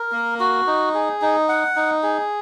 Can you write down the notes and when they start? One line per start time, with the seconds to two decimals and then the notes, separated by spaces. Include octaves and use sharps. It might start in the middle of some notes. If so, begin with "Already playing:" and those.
Already playing: A#4
0.12 A#3
0.40 F#4
0.67 D#4
0.94 G#4
1.22 D#4
1.49 F#5
1.76 D#4
2.03 G#4